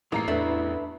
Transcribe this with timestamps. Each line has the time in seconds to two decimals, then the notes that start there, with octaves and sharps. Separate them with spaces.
0.12 A1 G#3 A#3 A#5 C7
0.28 E2 A3 D4 E4 A4 B4